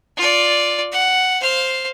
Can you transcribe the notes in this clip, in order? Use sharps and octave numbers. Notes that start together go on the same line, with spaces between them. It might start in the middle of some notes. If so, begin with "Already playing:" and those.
F4 D5
F#5
C5 F5